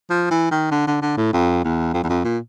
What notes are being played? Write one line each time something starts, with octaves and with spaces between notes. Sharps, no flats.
F3
E3
D#3
D3
D3
D3
A2
F2
E2
F2
E2
F2
A#2